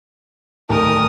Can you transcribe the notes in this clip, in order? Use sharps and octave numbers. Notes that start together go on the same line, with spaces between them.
D1 D#3 A#4 A5 D#6